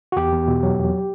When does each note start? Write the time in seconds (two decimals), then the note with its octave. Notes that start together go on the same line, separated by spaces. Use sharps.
0.12 F#4
0.16 E2 G4
0.33 E2
0.48 B2
0.63 F#3
0.78 E2